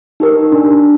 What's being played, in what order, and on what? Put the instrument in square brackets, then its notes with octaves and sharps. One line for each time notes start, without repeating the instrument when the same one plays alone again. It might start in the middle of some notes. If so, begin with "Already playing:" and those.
[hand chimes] D#4 G4 A#4
D4